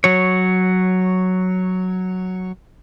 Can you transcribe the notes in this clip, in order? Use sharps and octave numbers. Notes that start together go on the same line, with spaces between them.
F#3 C#5